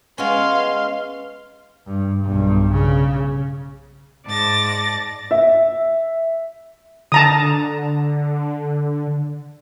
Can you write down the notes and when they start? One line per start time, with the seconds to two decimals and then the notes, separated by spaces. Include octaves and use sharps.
0.18 G#3 B3 C#4 F5 C6
1.87 G2
2.24 B1 G2
2.73 C#3
4.26 G#2 D5 A5 A6 A#6
5.31 E5
7.12 D3 A5 A#5 D#6